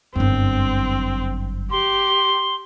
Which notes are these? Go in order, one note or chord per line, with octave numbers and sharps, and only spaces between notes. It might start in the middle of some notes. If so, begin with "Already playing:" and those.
G1 F#2 C4
G4 C6